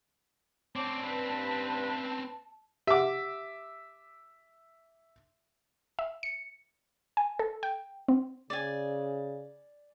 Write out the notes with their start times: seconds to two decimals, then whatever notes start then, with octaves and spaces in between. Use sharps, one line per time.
0.76 C4 C#4 C#5 D5 A5 D6
1.03 G2 B4
2.87 G4 E5 F#5 D6
5.99 E5
6.23 C#7
7.17 G#5
7.39 A4
7.63 G5
8.08 C4
8.50 C#3 D5 G#5